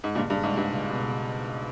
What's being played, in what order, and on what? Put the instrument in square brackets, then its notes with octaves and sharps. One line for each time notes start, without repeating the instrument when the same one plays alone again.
[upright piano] G#2
[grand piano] C#2 [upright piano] G2 A#2
[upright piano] G2
[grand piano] G#3
[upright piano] G#2
[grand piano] C#2 [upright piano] G2
[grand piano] C#2
B2
C#2